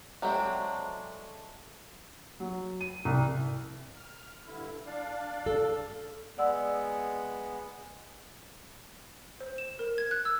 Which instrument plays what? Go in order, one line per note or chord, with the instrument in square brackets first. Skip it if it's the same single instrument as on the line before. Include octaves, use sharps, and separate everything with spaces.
[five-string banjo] F#3 G#3 A3 C4 D4
[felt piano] F#3
D#7
C2
[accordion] F6
G2 D3 E4
D4 D5 F5
[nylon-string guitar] A4
[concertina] G#3 B3 [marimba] D5 F#5 E6
[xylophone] C5
E7
A#4
G#6
F#6
E6